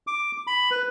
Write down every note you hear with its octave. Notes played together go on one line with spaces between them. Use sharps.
D6
B5
B4